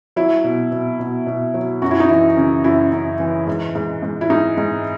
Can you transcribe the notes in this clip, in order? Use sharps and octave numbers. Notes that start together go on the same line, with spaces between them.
F#3 E4
B2
B2
B2
B2
F#3
F#2 F#4
E4
D#4
E3 E4
C#3
F#2 E4
F#2
E3
G#2
G#2
G#2
E4
G#2 D#4
G#2